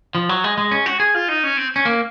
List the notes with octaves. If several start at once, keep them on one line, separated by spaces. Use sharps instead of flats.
F3
F#3
G#3
G#3
C#4
F#4
G#4
F4
D#4
C#4
C4
C#4
A#3